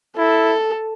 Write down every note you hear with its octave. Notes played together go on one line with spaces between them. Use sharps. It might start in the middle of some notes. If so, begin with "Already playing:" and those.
E4 A4